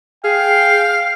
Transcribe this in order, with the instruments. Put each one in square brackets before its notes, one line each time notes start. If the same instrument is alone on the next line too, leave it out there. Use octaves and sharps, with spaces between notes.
[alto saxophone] G#4 [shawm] F5 [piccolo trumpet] G5 [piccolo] C7